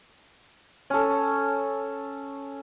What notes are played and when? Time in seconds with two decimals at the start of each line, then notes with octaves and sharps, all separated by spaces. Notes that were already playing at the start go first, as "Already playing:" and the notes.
0.90 C#4 A4